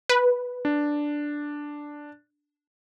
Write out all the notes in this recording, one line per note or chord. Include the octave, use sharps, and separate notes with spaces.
B4
D4